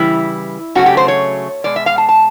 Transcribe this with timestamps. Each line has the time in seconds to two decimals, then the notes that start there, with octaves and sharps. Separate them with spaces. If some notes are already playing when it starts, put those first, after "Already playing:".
Already playing: C#3 E3 G3 E4
0.75 C#3 F#3 A3 F#4
0.86 G4
0.97 C5
1.08 C#5
1.64 B2 G#3 D5
1.76 E5
1.86 F5
1.98 A5
2.09 A5